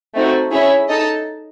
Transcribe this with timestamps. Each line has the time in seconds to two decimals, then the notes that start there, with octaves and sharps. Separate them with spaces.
0.14 A3 C4 D#4 F#4
0.51 C#4 E4 G#4 C#5 E5
0.88 D#4 A4 D#5 A5